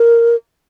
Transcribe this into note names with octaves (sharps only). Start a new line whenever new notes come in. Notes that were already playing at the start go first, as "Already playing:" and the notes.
Already playing: A#4